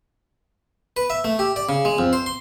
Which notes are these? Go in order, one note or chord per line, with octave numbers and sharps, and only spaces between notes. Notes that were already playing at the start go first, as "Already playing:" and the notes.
B4
E5
A3
G4
D5
C#3
G#3
F2
C5
C6